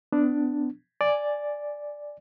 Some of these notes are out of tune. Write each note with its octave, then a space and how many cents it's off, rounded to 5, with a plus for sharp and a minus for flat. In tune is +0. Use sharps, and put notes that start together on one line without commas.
B3 +30 D4 +0
D5 +0 G#5 +0